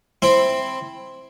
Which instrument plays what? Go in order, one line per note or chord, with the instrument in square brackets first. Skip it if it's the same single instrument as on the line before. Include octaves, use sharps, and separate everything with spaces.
[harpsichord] C4 E4